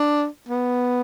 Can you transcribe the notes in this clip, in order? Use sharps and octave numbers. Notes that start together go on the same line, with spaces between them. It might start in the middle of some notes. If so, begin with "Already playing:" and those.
Already playing: D4
B3